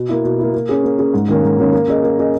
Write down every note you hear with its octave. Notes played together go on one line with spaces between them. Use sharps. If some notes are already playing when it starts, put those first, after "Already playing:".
Already playing: B2
A#3 E4
B2
A#3 E4
A#3
C#4 G#4
A#3
C#4 G#4
G#2
D#3 A#3 C#4
G#2
D#3 A#3 C#4
A#3
C#4 G#4 D#5
A#3
C#4 G#4 D#5